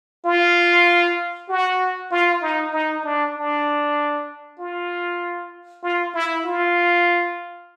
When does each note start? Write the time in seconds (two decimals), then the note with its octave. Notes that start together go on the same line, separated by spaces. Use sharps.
0.25 F4
1.49 F#4
2.11 F4
2.41 D#4
2.73 D#4
3.04 D4
3.35 D4
4.59 F4
5.83 F4
6.14 E4
6.45 F4